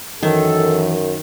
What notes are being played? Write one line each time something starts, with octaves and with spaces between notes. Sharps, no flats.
F#2 D#3 E3 A4